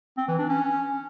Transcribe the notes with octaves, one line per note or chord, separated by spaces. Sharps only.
C4
E3
D4
C#4